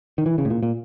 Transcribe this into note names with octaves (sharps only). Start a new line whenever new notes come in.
D#3
E3
C#3
A2
A#2
A#2